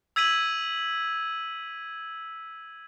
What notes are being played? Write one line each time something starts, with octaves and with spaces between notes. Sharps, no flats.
E6 G#6 B6 D#7 F#7